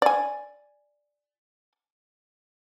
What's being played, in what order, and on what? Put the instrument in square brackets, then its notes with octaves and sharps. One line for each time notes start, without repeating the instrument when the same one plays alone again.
[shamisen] D5 G#5